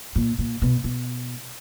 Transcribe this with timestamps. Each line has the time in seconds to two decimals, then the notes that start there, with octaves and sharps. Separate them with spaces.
0.16 A#2
0.39 A#2
0.62 B2
0.84 B2